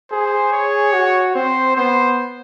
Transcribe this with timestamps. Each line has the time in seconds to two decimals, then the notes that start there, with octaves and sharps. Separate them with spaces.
0.11 G#4 C5
0.52 C#5
0.94 F#4
1.35 C4 C5
1.76 B3 C5